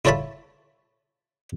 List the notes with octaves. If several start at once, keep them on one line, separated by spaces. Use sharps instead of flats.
E4 F4 A4 C#5 A5 B5